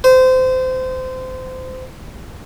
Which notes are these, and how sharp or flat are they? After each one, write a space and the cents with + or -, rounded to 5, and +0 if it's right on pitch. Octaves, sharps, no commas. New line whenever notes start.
C5 -25